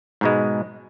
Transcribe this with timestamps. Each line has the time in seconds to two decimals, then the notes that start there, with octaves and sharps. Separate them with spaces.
0.21 G#2 B2 G#3